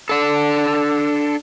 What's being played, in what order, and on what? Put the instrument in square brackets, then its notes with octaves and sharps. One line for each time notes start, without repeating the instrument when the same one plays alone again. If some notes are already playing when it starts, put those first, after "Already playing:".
[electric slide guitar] D4 A4